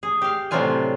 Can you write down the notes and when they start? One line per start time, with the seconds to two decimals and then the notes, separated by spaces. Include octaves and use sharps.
0.03 G#4
0.22 G4 F5
0.51 A2 C3 F#3 D4 F4 G#5